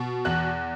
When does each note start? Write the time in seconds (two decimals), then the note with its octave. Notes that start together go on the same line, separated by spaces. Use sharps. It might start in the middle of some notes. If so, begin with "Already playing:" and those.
Already playing: B2
0.25 E2 F#6